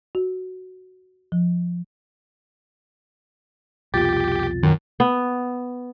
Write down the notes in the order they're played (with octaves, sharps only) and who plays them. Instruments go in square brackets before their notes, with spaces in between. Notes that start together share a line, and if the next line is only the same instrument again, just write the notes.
[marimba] F#4
F3
[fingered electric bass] C2 F2 B2 [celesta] F4 A6 [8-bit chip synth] G4
[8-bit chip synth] F#2 [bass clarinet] D#3
[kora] B3